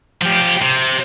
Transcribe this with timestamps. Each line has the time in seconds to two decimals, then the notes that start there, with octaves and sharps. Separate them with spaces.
0.22 F3 G4
0.62 C3